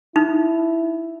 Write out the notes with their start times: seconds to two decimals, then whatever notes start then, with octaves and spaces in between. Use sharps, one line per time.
0.16 D#4 E4